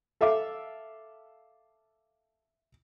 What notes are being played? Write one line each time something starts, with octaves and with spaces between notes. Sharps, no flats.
A4 E5 F5 D6